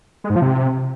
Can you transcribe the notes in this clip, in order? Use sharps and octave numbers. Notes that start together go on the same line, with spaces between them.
G#3
G#2
F3
C3